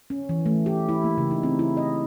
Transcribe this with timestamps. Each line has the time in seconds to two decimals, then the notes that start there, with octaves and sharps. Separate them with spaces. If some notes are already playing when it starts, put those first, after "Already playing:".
0.10 C#4
0.29 E3
0.46 A3
0.66 G4
0.89 E4
1.04 A#3
1.17 C#3
1.31 D#4
1.43 C4
1.59 E4
1.77 D#5